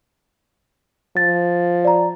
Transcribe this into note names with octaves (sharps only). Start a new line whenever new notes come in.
F3 A6
D5 A#5